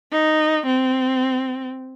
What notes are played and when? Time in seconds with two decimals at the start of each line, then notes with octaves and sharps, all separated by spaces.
0.12 D#4
0.66 C4